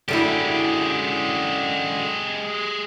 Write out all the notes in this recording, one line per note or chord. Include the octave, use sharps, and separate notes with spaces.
F#2 D3 G#3 E4 G4